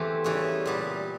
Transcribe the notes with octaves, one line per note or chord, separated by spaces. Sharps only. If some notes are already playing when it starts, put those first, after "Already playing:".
Already playing: E2 E3 A3 C4 G4
C#3 E3 G3
A#2 G3 B3